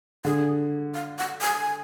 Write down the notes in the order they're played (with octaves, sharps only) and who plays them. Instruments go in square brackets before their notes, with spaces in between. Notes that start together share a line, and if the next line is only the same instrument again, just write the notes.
[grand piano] D3 [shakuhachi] G#4
[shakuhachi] F5
F#5
G#5